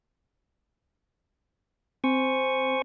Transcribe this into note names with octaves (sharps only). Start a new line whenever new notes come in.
C4 C5 G#5 C#6